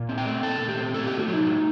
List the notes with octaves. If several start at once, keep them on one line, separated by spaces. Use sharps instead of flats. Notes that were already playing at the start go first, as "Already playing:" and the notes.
Already playing: A#2
C4
G5
A3
A#2 A4
A#2
G4
C4
A2 A4
A3 G4
F#4
F#3
D#4
A2